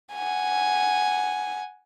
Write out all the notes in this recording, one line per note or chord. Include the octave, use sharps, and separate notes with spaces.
F#5 G#5